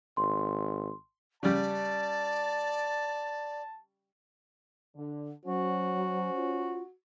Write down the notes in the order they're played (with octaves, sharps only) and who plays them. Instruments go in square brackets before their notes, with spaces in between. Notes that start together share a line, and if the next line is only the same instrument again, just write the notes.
[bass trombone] G#1 [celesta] C6
[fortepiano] C#3 G3 [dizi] D5 [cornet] A5
[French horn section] D3
[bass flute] F#3 [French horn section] C#4 C5 [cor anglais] F#4
[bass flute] F4